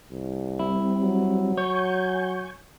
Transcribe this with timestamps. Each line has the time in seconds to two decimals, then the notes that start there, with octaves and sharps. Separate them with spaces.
0.11 C2
0.59 G3 C4 E4
1.01 F#3
1.57 C#5 G#5 C#6 G6